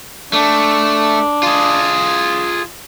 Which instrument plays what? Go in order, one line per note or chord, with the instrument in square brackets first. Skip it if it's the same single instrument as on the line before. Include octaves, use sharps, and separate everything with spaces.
[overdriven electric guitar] A3 [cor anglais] D4
[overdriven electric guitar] F4 G#4